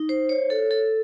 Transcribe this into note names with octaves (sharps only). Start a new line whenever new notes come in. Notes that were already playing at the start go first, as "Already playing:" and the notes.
Already playing: D#4
C5
C#5
A4
A4